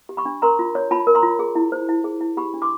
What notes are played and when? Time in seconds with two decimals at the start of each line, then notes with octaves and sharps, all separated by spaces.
0.09 G4
0.17 B5 C#6
0.25 D4
0.42 A#4 A#5 C6
0.59 F4
0.75 C#5
0.91 F4 A5 B5
1.07 A#4
1.15 A#5 C6
1.23 F4
1.39 G#4
1.55 E4
1.72 C5
1.89 E4
2.04 G#4
2.21 E4
2.37 G4 B5 C#6
2.54 D4
2.62 C6 D6